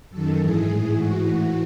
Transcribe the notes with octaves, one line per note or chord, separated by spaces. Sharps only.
F#2 D#3 A4
G#2 E3 G#4
A2 E3
G#2 E3 F#4
A2 E3